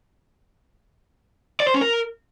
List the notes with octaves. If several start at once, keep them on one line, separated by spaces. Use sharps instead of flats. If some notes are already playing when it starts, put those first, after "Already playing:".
D5
C5
C#4
A#4